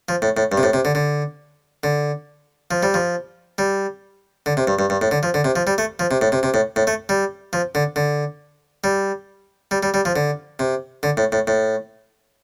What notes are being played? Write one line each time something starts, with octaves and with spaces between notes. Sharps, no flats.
F3
A2
A2
G2
C3
A2
C3
D3
D3
D3
F3
G3
F3
G3
D3
C3
G2
G2
G2
A2
D3
F3
D3
C3
F3
G3
A3
F3
C3
A2
C3
C3
A2
A2
A3
G3
F3
D3
D3
G3
G3
G3
G3
F3
D3
C3
D3
A2
A2
A2